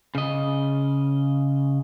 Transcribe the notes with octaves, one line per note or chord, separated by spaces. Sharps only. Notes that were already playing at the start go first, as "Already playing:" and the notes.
C#3 D#5